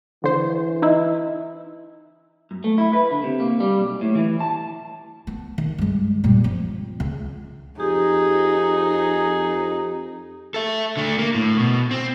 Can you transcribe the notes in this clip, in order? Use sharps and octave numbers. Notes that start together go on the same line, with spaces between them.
D3 E3 C5
D#4 E4
F#2
A3
E4
B4
D3
C3
A#3
G3
B1
A2
E3
A5
B3
D#3
G2 G#3
G2 A#2
F3 C4
C#2
F2 D#4 G4 G#4
A4 E5
D3 A3
A#3
A2
B2
C4